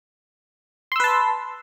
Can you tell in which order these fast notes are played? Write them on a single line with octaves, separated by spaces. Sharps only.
C6 E6 B4 A5